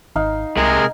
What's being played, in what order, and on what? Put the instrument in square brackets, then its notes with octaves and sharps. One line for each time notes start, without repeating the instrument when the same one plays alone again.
[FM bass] G#1 [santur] D#4 F5
[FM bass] C2 [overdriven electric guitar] C3 G#3 [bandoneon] G#4 A#4 F6